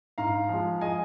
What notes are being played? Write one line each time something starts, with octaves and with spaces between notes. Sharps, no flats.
G#2 F5 A#5
F3 G#3
D#5 G#5